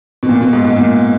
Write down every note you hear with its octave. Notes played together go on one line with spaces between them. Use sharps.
B2
A#2
B2
G#2
G#2
A#2